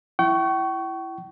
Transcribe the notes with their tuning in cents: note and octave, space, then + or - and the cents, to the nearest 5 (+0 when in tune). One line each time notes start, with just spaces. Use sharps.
E4 +15 G5 -40 C#6 +10